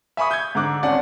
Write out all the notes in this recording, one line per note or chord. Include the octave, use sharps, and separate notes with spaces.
E5 G#5 B5 C#6 D#6
G6 G#6
G#2 D3 D6 F#6
G#1 C#4 D5 F#5 A5